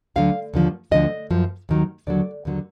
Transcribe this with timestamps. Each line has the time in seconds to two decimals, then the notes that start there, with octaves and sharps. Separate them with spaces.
0.16 D2 D3 F#3 F5
0.54 D#2 D3 F3
0.91 D2 D3 F3 D#5
1.31 F#2 F3
1.69 D#2 D#3 F#3
2.07 D#2 D3 F#3 D5
2.45 D#2 D3 F#3